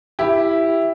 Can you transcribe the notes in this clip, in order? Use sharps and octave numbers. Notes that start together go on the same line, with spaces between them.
E4 G4